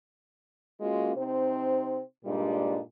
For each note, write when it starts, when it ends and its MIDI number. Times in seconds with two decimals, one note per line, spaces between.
0.81 1.15 56
0.81 1.15 58
0.81 1.15 61
0.81 1.15 65
0.81 1.15 66
1.16 2.00 48
1.16 2.00 60
1.16 2.00 63
1.16 2.00 72
2.25 2.80 43
2.25 2.80 46
2.25 2.80 55
2.25 2.80 56
2.25 2.80 62
2.25 2.80 63